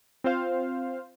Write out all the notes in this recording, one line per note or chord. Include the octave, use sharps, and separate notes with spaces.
C4 F4 C5 F5